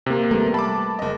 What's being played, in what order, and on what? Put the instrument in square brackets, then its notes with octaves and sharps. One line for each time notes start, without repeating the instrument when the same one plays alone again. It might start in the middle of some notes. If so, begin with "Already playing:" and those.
[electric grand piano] C3 A#3
[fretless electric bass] G3 A3 [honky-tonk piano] B3 A#4
[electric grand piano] A5 [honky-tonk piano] B5 D6
[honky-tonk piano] F#1 D#5